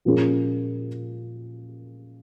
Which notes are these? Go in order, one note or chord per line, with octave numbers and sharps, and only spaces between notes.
A#2 F3 A#3 C#4 G#4